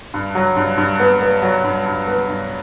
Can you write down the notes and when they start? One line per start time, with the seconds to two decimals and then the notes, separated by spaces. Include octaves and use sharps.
0.14 G2
0.35 F#3
0.57 G2
0.78 G2
1.00 B3
1.21 B3
1.42 F#3
1.64 G2
1.86 G2
2.08 B3
2.29 G2